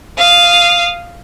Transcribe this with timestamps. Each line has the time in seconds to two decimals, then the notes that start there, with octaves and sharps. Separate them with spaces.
0.18 F5 D#6